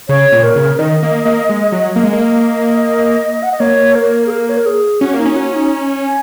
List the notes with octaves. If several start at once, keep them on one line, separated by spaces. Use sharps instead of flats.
C#3 C#5
A#2
A#4
C#3
D#3 D#5
A#3
A#3
G#3
F#3
A#3
G#3
A#3
D#5
F#5
D#5
A#3 C#5
A#4
G#4
A#4
C#5
A#4
G#4
C#4 F#4
A#3 D#4
C#4
F#4
D#4
G#5